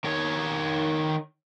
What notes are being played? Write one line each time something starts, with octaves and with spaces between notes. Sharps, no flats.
D#3 C#5